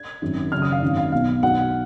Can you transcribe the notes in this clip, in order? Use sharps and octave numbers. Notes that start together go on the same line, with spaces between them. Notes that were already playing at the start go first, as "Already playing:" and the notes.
Already playing: G#6
G#1 F#2 D#3
F#1 F#2 C#3 F6
D#6
F5
G#1 F#2 D#3
F5
B1 B2 F5
B1 B2 F#5